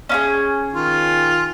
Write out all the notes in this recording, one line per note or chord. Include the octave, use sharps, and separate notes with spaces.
C#4 E4 G#4
D#3 F4